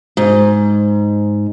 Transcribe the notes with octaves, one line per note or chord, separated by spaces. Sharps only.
G#2